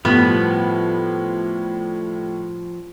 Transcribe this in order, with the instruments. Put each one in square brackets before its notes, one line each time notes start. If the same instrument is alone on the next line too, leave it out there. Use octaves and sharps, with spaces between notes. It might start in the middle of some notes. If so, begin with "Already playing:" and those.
[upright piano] A2 G3 [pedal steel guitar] F3 B5 F6 [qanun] B3